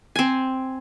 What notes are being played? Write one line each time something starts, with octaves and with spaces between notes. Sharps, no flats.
C4 G#5